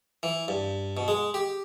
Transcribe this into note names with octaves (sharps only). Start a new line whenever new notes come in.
E3
G2
B2
G#3
G4